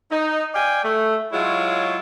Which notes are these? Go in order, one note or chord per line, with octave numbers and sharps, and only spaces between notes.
D#4
D5 F5 G5 G#5
A3
F#3 G#3 E4 F4 C#5